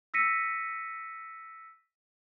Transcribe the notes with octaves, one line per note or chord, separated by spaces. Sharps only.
E6 A#6 B6 C#7 D#7